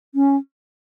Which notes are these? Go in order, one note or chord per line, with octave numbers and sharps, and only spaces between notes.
C#4